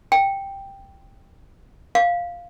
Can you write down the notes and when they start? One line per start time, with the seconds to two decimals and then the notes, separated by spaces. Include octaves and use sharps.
0.12 G5
1.95 F5